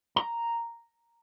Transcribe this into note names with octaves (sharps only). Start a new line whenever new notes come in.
A#5